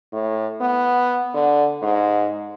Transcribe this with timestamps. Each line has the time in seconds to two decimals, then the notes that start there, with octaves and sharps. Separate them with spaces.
0.13 A2
0.61 B3
1.34 D3
1.82 G#2